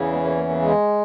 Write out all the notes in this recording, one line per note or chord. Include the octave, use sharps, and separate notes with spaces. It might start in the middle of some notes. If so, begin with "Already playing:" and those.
Already playing: E2 C#3 E3
G#3 B3
A#3 C#4
A#3
A#3
G#3